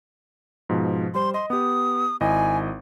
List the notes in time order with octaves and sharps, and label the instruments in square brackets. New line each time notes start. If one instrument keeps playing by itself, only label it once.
[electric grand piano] G#2 B2 F3
[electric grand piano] G3 C5 [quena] C6
[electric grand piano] D#5 [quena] C6
[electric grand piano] B3 G4 [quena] D#6
[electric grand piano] G#1 E4 D#5 [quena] G#5